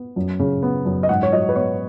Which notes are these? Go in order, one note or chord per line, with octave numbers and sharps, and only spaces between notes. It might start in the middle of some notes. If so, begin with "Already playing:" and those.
Already playing: B3
F#2
C#3
B3
F#2
D#5
G#2 F#5
C#5
F#3 D#5
B4
B3 C#5